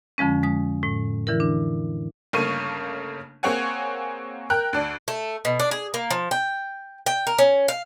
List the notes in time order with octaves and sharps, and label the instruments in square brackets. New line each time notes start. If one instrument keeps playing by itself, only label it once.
[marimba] F2 D3 F3 G#3 C#4
G#3 D#6
A2
D3 E3 E4 A#4
D4
[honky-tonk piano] G1 C#3 A3 A#3 C#6 D#7
A#3 C4 G#4 C#5 F#5 G#5
A#4 G5 F#6
D2 D4
[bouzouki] A3
B2
D4
G#4
A#3
F3
G5
G5
A#4
C#4
F5